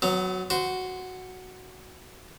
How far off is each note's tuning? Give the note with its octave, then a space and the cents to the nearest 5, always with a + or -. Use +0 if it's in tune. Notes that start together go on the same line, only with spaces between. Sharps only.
F#3 +0 B3 +35
F#4 +0 C5 -20